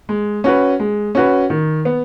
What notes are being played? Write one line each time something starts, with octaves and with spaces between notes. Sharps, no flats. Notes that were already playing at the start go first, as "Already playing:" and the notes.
G#3
C#4 F#4 B4
G#3
C#4 F#4 B4
D#3
B3